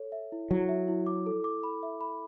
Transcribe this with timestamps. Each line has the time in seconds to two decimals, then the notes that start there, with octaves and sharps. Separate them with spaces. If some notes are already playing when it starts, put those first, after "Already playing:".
Already playing: A4 C#5
0.12 E5
0.32 E4
0.51 F#3 E4
0.69 E5
0.88 E4
1.07 D6
1.26 A4
1.44 D6
1.63 B5
1.83 E5
2.01 B5